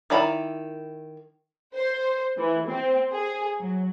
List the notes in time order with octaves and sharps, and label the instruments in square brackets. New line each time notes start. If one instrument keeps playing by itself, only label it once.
[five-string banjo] D#3 E4 D5 A#5 B5
[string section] C5
E3
C4
G#4
F#3